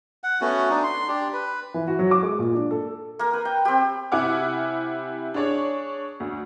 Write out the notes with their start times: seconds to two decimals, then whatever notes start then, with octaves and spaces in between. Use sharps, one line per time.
0.24 F#5
0.41 A3 B3 C#4 F#4
0.69 D4 D#4
0.83 C6
1.08 D4 G4
1.33 B4
1.74 E3
1.88 F#4
1.99 F#3
2.11 D6
2.23 G#3
2.39 A#2
2.55 D4
2.71 A4
3.19 A#3 A#4
3.33 B4
3.45 G5
3.65 C4 G4
4.12 C3 E4 F#5 G#5 D6 F6
5.34 D4 G#4 C#5 D5
6.20 D2